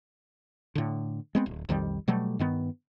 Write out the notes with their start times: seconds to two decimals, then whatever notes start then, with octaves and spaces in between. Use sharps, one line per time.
0.75 A2 D3
1.35 G#3 B3 C4
1.46 D1
1.69 B1 F2 D#3 G3
2.08 B2 F#3 G3 A3
2.39 G2 D#3 B3